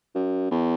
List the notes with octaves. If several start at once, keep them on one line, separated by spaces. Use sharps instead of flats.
F#2
E2